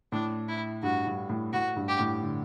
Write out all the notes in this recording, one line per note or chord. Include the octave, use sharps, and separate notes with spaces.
A2 D4
E4
G2 F#4
G2
A2
A2 F#4
G2
G4
A2
D3